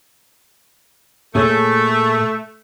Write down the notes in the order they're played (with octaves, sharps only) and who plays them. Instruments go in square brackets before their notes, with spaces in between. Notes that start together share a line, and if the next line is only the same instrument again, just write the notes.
[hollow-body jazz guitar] A#2 G#4 C#5 [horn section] A3